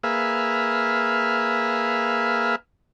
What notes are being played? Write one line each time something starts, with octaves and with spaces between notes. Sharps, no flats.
A#3 G#4 B4 E5 F5